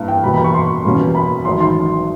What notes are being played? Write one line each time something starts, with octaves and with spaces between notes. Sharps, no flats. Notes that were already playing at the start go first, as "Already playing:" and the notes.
Already playing: G2 E3 A#3
G5
E2 B2 G3 A#3 B5
B5
C#6
C6
E2 B2 G3 A#3 C#4
B5
A1 G#2 D#3 F#3 C6
C6